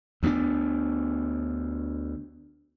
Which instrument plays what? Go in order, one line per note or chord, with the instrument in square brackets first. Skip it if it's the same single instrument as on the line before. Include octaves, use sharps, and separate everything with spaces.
[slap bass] D2 B3 C4 D4